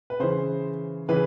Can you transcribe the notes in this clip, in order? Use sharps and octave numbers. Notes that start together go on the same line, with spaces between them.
B4
C#3 E3 C5
C#3 E3 B4